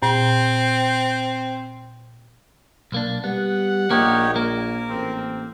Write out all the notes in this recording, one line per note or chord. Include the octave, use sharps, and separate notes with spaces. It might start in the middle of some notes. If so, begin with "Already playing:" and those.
A#2 C4
B1 A#3 D4
G3 B3 F#5
A#1 A#3 D#4 G4 C#5
A#3 A#4
A1 C4